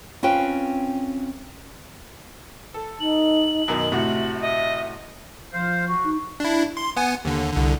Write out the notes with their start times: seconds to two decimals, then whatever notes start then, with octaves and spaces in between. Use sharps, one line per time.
0.23 C4 C#4 F4 B4 G5
2.74 A4
3.00 D#4 F#7
3.68 F#2 B2 D#3
3.92 A2 C3 F#4 E5
4.41 D#5 E5
5.53 F3 C5 F5
5.87 F#4
6.04 D#4
6.40 D4 E4
6.77 C6
6.96 B3 F#5 G#5
7.25 D#2 D3
7.53 C2 D3